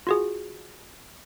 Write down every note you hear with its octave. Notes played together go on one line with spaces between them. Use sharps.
F4 F#4 G#4